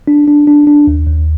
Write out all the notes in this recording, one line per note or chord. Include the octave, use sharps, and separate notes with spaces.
D4
D4
D4
D4
D#2
D#2